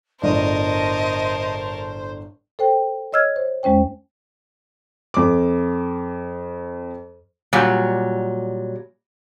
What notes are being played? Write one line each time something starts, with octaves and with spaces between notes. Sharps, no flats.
G1 A2 A#4 C5 D5 D#5 A5
A4 C5 G5
C#5 D#5 E6 F6 G#6
C5
E2 G#3 C#4 C5 G5
F2 D6
A#2 F#3 G3